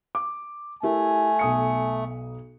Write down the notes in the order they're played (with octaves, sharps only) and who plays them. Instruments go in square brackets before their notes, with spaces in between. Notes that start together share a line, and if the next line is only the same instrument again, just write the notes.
[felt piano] D6
[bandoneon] A3 [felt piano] E4 G4 A#4 [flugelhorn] G#5
[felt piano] B1 D#6 C#7